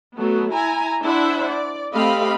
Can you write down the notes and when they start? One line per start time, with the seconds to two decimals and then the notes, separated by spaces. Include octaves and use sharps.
0.16 F#3 A3 B3
0.55 E4 G#5 A#5
1.03 D4 E4 C5 E5 F#5
1.50 D5
1.93 A3 C4 G4 D#5 F5 B5